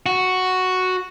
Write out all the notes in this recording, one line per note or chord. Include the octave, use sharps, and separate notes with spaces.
F#4